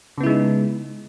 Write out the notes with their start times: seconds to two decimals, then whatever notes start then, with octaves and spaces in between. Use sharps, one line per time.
0.18 C#3
0.20 B3
0.23 E4
0.26 G#3
0.29 D#4